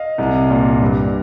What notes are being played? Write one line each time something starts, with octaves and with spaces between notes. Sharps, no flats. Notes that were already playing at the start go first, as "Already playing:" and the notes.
Already playing: D#5 F5
C2
A#2
G2